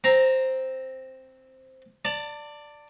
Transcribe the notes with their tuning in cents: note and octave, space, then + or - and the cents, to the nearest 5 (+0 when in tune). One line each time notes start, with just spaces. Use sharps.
C4 +0 A#5 +0
D5 +0 A5 +35